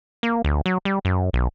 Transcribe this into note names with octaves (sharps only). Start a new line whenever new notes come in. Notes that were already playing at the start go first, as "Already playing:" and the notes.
A#3
D2
F#3
G3
F#2
B1